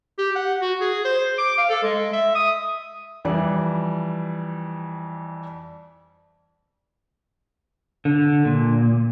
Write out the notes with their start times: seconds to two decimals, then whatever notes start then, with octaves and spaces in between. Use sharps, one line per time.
0.18 G4
0.35 F#5
0.61 F#4
0.81 G#4
1.05 C5
1.38 D6
1.58 F5
1.70 A4
1.83 G#3
2.13 E5
2.35 D#6
3.25 F2 E3 G3 D5
8.05 D3
8.45 A#2